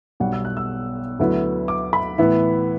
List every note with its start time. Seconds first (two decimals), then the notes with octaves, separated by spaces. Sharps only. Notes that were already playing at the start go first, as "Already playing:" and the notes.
0.20 B1 B2 G3 F#5
0.33 E6
0.45 F#6
0.57 E6
1.19 D2 D3 F#3 B3 E4
1.68 D6
1.93 B5
2.18 A2 E3 B3 E4